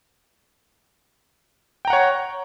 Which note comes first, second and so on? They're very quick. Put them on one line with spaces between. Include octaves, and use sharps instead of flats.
G5 A#5 F#5 C#5